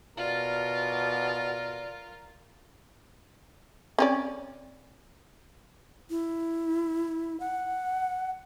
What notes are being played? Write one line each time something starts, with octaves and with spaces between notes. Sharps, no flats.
B2 F4 A#4 D5
C4 C#4 D5
E4
F#5